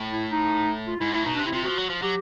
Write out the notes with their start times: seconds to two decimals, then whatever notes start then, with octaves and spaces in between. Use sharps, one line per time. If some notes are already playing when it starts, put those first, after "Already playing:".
Already playing: A2
0.11 E4
0.31 D#4
0.88 F4
1.00 G#2 E4
1.13 A2 E4
1.26 B2 D#4
1.35 D4
1.39 C3
1.46 E4
1.52 C3 F4
1.64 F3 F#4
1.78 F#3
1.89 F3
2.02 F#3 G4